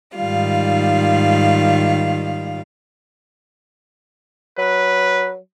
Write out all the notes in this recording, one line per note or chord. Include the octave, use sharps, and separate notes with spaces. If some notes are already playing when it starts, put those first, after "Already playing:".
G#2 D#3 G3 F4 F5
F#3 B4